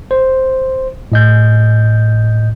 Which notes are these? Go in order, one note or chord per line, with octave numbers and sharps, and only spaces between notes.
C5
A2 D#5 G6